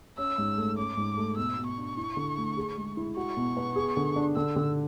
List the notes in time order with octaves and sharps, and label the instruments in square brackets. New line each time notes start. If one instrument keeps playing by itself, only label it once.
[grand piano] C#4 [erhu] E6
[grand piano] G#2
A3
[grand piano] C#4 [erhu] D6
[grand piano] G#2
A3
[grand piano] B2 [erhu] E6
[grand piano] B2
[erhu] C#6
[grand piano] D4
E4
D3
A3
G#4
G#3
E4
[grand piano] F#4 [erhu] C#6
[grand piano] B2
B3
G#4
D3
D4
[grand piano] D3 [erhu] E6
[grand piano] D3